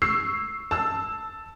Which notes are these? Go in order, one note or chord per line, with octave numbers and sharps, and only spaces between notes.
C#6 E6 C7
A5 E6